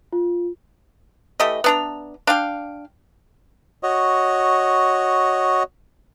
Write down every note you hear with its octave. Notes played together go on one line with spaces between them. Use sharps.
F4
E3 A3 G4 D#5
B3 D4 A#5
D4 F5 G5
F#4 C#5 D#5